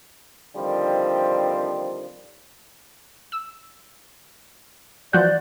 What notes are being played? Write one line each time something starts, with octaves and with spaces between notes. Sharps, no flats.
D3 D#3 F3 G3 C4
E6
E3 F3 F#4 D5 F#5 F#6 G6